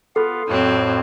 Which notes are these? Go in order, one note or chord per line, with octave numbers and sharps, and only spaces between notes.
B3 F4 A4 F5
F2 A2 F#3 C4